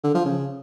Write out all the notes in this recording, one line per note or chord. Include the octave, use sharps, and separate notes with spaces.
D3
F3
C#3